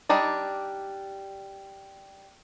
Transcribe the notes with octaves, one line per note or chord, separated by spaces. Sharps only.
G3 D4 D#4 D5